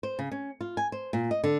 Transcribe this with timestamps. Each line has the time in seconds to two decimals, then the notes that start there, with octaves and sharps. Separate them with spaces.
0.03 C5
0.19 C#3
0.31 C#4
0.61 F4
0.77 G#5
0.92 C5
1.13 A#2
1.31 D#5
1.44 D3